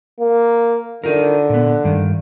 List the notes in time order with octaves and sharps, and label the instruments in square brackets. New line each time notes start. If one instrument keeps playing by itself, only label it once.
[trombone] A#3
[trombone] D3 [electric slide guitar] D#4 F4 A#4
[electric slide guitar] A#2 B3
G2 D#3